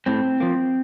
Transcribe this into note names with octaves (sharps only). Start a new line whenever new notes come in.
A2 C4
F3 A#3